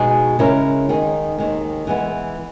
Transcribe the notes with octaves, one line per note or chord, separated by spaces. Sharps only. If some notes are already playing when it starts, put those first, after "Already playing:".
Already playing: B2 G#3 D#4 G#4
C#3 G#3 C#4 E4 A#4
D#3 G#3 D#4 G#4
D#2 D#3 G#3
E3 G#3 B3